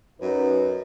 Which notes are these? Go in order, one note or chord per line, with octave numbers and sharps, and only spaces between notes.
F#2 D#4 B4